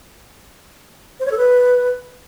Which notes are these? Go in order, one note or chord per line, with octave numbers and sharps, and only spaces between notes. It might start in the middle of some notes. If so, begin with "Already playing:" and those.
C5
C#5
A4
B4